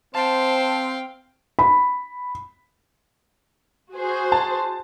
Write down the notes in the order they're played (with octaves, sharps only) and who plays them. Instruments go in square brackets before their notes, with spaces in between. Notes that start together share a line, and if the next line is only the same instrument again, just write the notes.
[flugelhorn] C4 [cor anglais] C5 [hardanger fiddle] F5 G5 [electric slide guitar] A5
[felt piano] B5
[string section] F#4 G#4 C5
[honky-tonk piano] A5